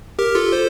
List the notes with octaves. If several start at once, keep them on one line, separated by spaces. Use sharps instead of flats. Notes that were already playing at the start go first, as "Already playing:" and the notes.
G4 A#4
F4 A4
A4 C5